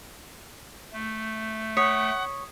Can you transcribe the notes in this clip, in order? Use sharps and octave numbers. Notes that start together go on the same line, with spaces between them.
A3
C#5 F#5 D#6 B6 C#7